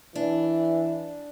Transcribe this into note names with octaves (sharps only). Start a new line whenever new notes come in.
E3 D4